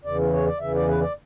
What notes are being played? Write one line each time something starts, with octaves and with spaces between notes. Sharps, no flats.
E2 C#3 E3 D5
C#5
D5
E2 C#3 E3 E5
D5
B4
D5